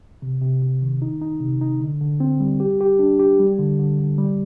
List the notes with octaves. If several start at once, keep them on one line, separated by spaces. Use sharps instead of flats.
C3
C3
C3
D#3
D#4
D#4
C3
D#4
D3
D3
C4
G3
G4
G4
D4
G4
G3
D3
D3
D3
G3